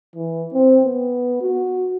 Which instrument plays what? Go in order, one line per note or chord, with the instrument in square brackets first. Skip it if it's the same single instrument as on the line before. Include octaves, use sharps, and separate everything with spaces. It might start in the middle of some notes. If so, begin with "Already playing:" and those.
[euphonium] E3
C4
B3
F#4